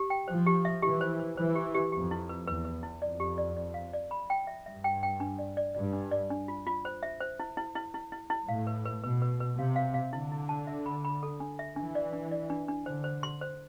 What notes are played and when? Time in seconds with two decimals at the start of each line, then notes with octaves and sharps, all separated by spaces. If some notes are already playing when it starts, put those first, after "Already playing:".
Already playing: G4
0.10 G5
0.28 F3 C5
0.47 G4
0.65 E5
0.82 E3 G4
1.01 C5
1.19 C5
1.37 E3 C5
1.55 G4
1.75 G4
1.92 F2 G4
2.11 E4
2.29 B4
2.47 E2 B4
2.65 B4
2.83 E4
3.02 F2 D5
3.20 G4
3.38 D5
3.57 D5
3.74 F5
3.94 D5
4.11 B5
4.30 G5
4.47 E5
4.66 G2 E5
4.84 G5
5.03 G5
5.20 D4
5.39 D5
5.57 D5
5.75 G2 D5
5.93 D4
6.11 D5
6.31 D4
6.48 F4
6.67 F4
6.85 C5
7.03 E5
7.20 C5
7.40 E4
7.57 E4
7.76 E4
7.94 E4
8.12 E4
8.30 E4
8.48 A2 F5
8.67 B4
8.85 B4
9.04 B2 B4
9.22 B4
9.40 B4
9.58 C3 F5
9.76 F5
9.94 F5
10.13 D3 E4
10.32 E4
10.49 A5
10.67 E5
10.86 B5
11.05 B5
11.23 A4
11.40 D4
11.59 E5
11.76 E3 D4
11.95 D5
12.13 D4
12.31 D5
12.50 D4
12.68 D4
12.86 D3 C5
13.04 C5
13.23 C6
13.41 C5